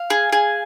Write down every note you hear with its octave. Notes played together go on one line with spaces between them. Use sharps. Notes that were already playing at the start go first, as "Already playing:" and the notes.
Already playing: F5
G#4
G#4